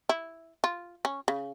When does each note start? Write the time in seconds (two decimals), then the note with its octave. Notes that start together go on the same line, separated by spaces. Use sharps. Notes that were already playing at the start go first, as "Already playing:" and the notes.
0.09 E4
0.64 F4
1.05 C#4
1.28 C#3